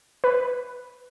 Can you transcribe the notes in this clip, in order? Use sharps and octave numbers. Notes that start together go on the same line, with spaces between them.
B4